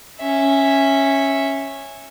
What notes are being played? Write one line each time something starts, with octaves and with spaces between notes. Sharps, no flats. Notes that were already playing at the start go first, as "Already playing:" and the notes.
C#4 E5